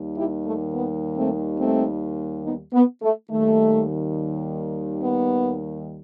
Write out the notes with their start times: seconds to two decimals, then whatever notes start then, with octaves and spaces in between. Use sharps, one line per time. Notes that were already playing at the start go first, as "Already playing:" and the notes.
Already playing: D#2 D#3 G3
0.16 E4 G4
0.46 A3
0.73 B3
1.16 A3 C4
1.59 A3 C4
2.44 B3 D#4
2.73 B3
3.02 A3
3.30 D#2 D#3 G3 A3
5.02 B3